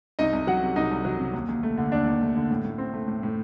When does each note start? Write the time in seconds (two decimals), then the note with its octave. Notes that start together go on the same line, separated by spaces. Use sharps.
0.19 C2 D#4 D#5
0.33 C2
0.47 F#3 F#4 F#5
0.62 C3
0.76 C2 D#4 D#5
0.91 C2
1.05 F#3
1.19 C3
1.33 D#2
1.48 D#2
1.63 A3
1.78 D3
1.92 D#2 D4 D5
2.06 D#2
2.21 A3
2.36 D3
2.51 A2
2.64 A2
2.78 C4
2.94 A3
3.08 A2
3.23 A2